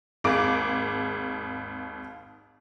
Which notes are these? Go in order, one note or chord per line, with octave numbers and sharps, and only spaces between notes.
G#1 D#2 G#4 D6 D7